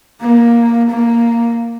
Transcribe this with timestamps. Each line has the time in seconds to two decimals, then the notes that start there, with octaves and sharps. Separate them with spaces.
0.20 A#3
0.90 A#3